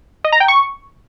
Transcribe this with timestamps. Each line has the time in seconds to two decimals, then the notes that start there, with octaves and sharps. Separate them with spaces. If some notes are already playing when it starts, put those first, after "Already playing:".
0.24 D#5
0.32 A#5
0.40 G5
0.48 C#6